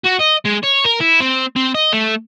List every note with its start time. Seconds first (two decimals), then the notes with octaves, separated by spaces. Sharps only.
0.05 F#4
0.20 D#5
0.46 G#3
0.64 C#5
0.85 A#4
1.01 E4
1.20 C4
1.56 C4
1.74 D#5
1.93 A3